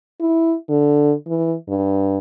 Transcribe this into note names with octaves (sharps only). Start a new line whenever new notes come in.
E4
D3
E3
G2